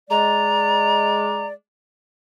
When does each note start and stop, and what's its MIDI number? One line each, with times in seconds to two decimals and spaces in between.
0.10 1.54 56
0.10 1.54 74
0.10 1.46 82